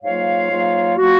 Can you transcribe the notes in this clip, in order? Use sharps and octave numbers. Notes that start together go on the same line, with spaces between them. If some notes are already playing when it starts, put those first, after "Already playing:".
G#2 F#3 A#3 F4 C#5 F5
G#2 F#3 A#3 F4
F#3 A#3 F4 F#4